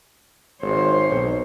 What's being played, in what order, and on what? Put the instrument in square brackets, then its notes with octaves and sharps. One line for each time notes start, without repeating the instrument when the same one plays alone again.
[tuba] G#1 [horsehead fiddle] C5 C#5
[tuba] B1